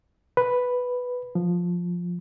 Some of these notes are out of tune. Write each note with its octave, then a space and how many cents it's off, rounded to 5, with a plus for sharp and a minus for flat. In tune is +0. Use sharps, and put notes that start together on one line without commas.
B4 +0
F3 +10